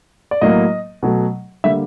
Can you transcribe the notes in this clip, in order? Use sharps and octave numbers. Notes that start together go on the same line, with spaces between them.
D5
A2 F#3 A#3 D#5
B2 F#3 A3
D3 G3 A#3 E5